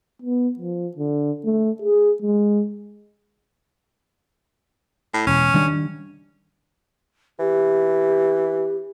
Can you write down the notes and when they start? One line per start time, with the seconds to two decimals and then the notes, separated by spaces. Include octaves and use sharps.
0.22 B3
0.59 F3
0.96 D3
1.45 A3
1.82 G#4
2.22 G#3
5.14 A2
5.27 E1 C#4
5.54 D#3 G3 D4
7.39 E3 G4